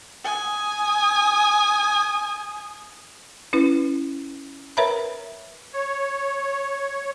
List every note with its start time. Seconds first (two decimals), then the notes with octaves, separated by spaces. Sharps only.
0.25 G#5 D#6
3.53 C#4 E4 B4
4.77 A#4 B4 C#5 E5 A#5 B5
5.73 C#5